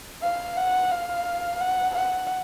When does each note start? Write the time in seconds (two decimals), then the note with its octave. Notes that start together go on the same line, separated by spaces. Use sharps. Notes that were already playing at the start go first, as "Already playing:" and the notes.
0.22 F5
0.57 F#5
0.91 F5
1.60 F#5
1.95 F#5